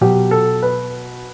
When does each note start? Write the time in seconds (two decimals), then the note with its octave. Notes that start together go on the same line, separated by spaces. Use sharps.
0.01 B2 F#3 G4
0.31 A4
0.63 B4